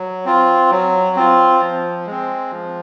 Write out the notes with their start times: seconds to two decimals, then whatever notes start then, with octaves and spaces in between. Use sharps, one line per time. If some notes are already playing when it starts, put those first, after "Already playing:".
Already playing: F#3
0.25 C4 F4
0.71 F#3
1.16 C4 F4
1.61 F3
2.07 G#3 C4
2.51 F3